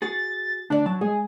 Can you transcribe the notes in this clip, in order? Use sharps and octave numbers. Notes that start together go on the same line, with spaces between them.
F#4 G#4 A6
D2 D4 D5
F#3 A5
G#3 G#4